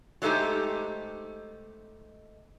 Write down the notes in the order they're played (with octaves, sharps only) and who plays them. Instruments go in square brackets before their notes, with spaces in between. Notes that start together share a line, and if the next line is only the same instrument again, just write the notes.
[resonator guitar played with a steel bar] F#3 G#3 A3 D#4 G4 C5